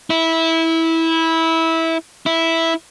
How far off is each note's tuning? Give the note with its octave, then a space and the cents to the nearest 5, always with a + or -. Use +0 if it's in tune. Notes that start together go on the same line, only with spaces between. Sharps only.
E4 -15
E4 -5